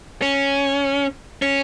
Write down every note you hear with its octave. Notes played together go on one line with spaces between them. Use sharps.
C#4
C#4